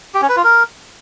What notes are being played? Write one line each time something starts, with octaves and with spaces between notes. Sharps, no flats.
G4
C#4
B4
F4
A#4